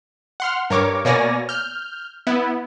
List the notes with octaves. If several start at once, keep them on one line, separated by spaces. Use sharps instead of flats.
F#5 C6 F6
G2 A#4 C#5 D6
B2 A#3 C#5 D5 G#5 A#6
F6 G6
B3 E4